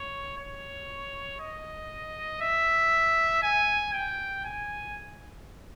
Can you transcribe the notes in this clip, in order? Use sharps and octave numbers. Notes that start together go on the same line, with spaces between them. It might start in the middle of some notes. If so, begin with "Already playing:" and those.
Already playing: C#5
C#5
D#5
E5
G#5
G5
G#5